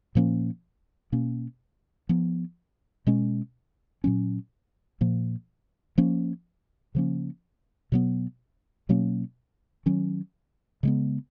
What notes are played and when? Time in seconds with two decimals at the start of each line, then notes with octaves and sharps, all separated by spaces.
0.15 A#2 F3 A#3 C#4
1.12 B2 A#3 C#4
2.09 F3 B3
3.07 B2 G#3 C#4
4.04 A#2 F#3 C#4
5.01 A#2 F3 A#3
5.98 F3 A#3 C#4
6.95 C#3 F3 A#3 C#4
7.92 B2 F#3 B3
8.89 B2 F#3 A#3 C#4
9.86 D#3 F#3 C#4
10.83 C#3 G#3 B3